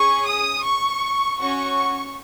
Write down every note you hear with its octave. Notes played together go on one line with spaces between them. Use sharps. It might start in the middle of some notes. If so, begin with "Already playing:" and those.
Already playing: C#4 G#4 C#6
D#6
C#6
C#4 F#4 C#6